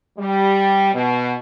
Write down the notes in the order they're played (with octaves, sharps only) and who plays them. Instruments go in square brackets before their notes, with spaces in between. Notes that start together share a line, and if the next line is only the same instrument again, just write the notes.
[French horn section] G3
B2